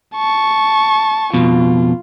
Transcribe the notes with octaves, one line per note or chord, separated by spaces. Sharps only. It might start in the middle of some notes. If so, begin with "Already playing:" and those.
A5 C#6
F2 B2 F4